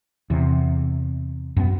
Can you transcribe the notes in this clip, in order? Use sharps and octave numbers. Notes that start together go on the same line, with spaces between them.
E2 C3
F#2 B3